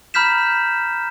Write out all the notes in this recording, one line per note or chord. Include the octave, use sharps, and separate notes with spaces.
A#5 B5 F6 G6 B6 E7